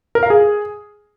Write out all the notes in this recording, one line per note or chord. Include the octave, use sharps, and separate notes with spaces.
A#4
F5
G#4